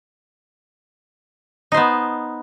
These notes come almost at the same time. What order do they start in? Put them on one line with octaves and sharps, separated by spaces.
D#4 C5 B3